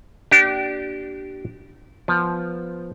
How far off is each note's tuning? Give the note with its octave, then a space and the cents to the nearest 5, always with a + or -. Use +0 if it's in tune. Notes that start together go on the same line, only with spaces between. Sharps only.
A#3 +35 D4 +0 G4 -30
F3 +0 B3 +0